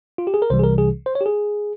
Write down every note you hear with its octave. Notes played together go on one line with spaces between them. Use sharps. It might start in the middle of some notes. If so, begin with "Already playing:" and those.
F4
G4
G#4
A#4
C2 C3 E3 G3 C5
G#4
A#4
G#4
C5
C#5
G4
G#4